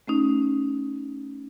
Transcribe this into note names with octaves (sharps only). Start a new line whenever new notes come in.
A3 C#4 D#4